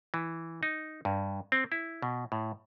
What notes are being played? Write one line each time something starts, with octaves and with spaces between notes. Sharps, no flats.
E3
D#4
G2
C4
E4
B2
A2